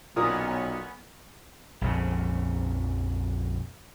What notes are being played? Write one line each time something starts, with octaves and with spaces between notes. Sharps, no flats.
B1 A#2 B3 C#4 A#4 D#6
A#1 F2 C#3